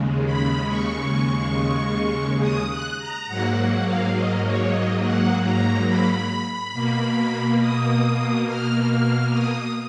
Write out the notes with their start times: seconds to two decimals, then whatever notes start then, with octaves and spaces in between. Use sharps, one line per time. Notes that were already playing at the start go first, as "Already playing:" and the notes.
Already playing: D#2 C#3 G#3
0.24 B5
0.68 C#6
2.41 D#6
2.69 F#6
2.98 A#5
3.27 G#2 F#3 A#3 F#5
3.56 F#5
3.85 F5
4.14 D#5
4.43 C#5
4.71 D#5
5.01 F#5
5.43 A#5
5.87 B5
6.73 B2 A#3
7.60 D#6
8.46 F6
8.90 F6
9.33 D#6